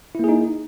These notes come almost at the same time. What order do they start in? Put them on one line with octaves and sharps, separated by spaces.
E4 A#3 G#4 D#4